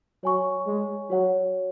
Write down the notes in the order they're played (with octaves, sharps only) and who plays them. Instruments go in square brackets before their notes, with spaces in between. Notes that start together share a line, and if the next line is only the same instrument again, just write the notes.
[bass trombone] F#3 [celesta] C#5 G#5 C#6
[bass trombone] G#3
[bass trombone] F#3 [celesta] F#4 C#5 F#5